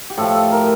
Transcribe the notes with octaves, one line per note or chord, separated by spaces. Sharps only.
G4
A2 F3 A4
A4
A#4